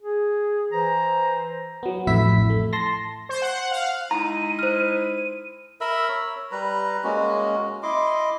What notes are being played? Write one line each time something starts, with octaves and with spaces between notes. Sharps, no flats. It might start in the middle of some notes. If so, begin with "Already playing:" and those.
G#4
E3 C5 A#5
F#3 B3
A1 F2 A2 E4 E5 B6
A3
A5 C6 A#6
C5
F#5
F5
G#3 D#4 E4 A#5 D#7
C5 F6
A#4 E5 B5 E6
C#5
G3 B4 A#5
G#3 A#3 C#4 F#4
E4 D#5 C6 D6